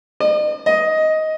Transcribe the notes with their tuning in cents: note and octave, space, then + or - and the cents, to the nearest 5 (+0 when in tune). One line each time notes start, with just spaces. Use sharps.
D#5 -40
D#5 +10